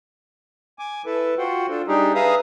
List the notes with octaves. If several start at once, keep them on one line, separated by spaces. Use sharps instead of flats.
G#5 D6
E4 A4 B4
F4 F#4 C5 F#5 G5
D4 F4 A4
G3 D4 D#4 G4 G#4
G#4 B4 E5 F5 A#5 D#6